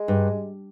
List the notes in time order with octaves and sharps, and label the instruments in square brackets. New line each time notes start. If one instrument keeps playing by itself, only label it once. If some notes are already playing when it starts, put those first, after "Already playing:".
Already playing: [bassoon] G#3
[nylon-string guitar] G2